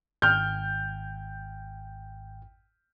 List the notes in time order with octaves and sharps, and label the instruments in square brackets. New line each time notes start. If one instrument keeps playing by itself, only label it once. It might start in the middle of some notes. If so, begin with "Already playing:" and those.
[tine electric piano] G#1 G5 [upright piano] F6 G6